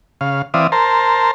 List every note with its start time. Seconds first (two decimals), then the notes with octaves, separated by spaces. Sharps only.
0.21 C#3 F5
0.54 E3 C4 D5 E5 F5 D#6
0.72 A#4 C5 A5 A#5 C6